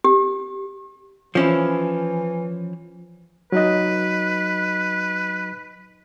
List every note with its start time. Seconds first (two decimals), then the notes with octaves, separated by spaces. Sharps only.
0.04 G4
1.35 E3 F3 C#4 E4
3.52 F#3 D#4 B4 D#5